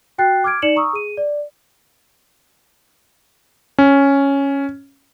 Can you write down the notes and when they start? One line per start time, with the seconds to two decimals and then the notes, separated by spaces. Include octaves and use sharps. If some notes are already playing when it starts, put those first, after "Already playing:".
0.18 F#4 G5 F#6 A6 C7
0.44 D6 F6 G#6 D7
0.62 D#4 D5 C#7 E7 F#7
0.76 A#5 C#6 D#6 E6
0.93 G#4 D#7
1.17 D5
3.78 C#4